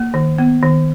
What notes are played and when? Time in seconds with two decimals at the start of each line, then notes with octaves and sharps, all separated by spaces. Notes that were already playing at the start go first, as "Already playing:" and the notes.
Already playing: A#3
0.14 D#3
0.38 B3
0.63 D#3